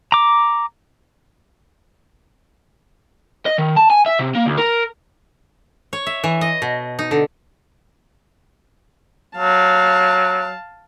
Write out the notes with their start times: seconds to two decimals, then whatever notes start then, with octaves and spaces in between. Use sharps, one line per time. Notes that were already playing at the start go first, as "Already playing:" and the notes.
0.12 A#5 D6
3.46 D#5
3.59 D#3
3.77 A5
3.90 G#5
4.06 E5
4.19 C3
4.35 A#3
4.46 D2
4.58 A#4
5.93 C#5
6.06 E5
6.24 E3
6.41 D#5
6.62 B2
6.99 D#4
7.11 D3
9.37 F#3 F5 A5